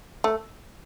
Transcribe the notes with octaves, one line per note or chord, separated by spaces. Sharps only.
A3